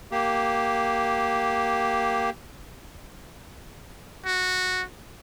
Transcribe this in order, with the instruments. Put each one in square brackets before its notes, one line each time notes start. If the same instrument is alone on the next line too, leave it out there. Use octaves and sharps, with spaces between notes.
[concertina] A#3 G4
[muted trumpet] F#4